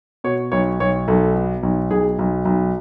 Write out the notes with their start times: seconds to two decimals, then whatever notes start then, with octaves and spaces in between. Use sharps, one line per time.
0.24 B2 C#5
0.52 B1 C#5
0.80 B1 C#5
1.08 B1 A4
1.35 B2
1.63 B1
1.91 B1 G#4
2.19 B1
2.45 B1